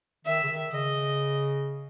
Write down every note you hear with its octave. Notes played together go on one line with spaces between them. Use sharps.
D#3 E5
C#3
D#3
C#3 D#5